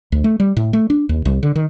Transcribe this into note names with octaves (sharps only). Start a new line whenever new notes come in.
D2
A3
G3
A2
A3
D4
D#2
C2
D3
D#3